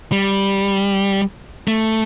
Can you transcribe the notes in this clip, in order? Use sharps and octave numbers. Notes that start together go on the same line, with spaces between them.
G3
A3